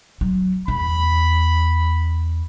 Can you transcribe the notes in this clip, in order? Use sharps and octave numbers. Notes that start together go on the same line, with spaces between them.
F#3
E2 B5